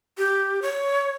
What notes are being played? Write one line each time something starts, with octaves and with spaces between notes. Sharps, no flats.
G4
C#5